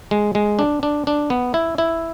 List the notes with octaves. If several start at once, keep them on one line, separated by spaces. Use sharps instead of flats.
G#3
G#3
D4
D4
D4
B3
E4
E4